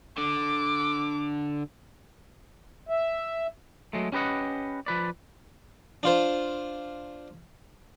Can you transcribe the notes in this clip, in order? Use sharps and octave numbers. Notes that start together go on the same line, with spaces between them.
D3 D6
E5
F#3 G#3 A3
C#4 G4 B4 D#5 F#5
F3 B4 D5
D4 F4 C5